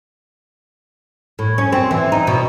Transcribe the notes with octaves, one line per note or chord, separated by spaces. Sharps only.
A2
C#4
C4
E3
D#4
B2